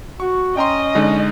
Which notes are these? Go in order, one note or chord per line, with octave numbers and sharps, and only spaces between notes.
F#4 C#6
C#4 D#5 G5 A#5 C6
D3 G#3 D#4